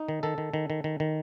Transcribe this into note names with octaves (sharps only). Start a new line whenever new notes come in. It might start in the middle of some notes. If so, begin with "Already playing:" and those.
Already playing: D#4
D#3
D#3 A4
D#3
D#3
D#3
D#3
D#3